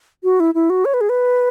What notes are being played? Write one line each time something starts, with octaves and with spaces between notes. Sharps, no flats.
F#4
E4
E4
F#4
C#5
B4
G#4
B4